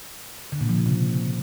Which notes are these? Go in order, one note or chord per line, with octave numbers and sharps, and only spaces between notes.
D3
A#2
F3
C#3
C3